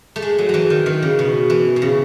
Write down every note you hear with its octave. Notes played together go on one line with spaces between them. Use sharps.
A3
G#3
F#3
E3 F#3
D#3
D#3
C#3
B2
E3
B2
C#3